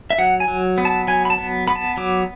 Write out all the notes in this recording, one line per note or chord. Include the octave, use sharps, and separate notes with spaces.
E5
F#3 F#5
G#5
F#3
B3
A5
F#3 G#5
B5
A5
B3
B3 B5
A5
F#3 D6